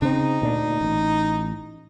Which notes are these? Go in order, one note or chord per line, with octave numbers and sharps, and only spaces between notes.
C#3 C4 D#4
D2 A#2 D4
A1